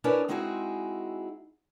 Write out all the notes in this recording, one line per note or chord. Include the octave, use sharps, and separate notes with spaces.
C#4 D4 E4 A#4 B4 C#5
G#3 C4 D#4 E4 F#4 G#4